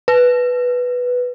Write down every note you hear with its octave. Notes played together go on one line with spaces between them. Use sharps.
B4